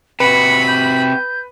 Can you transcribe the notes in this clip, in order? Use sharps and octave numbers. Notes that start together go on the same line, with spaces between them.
C3 F#4 B4 B5 C#7
G6